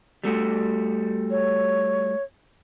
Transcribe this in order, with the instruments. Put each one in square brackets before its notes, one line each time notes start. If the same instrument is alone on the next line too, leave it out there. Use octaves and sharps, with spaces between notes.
[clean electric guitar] G3 A3 F#4
[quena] C#5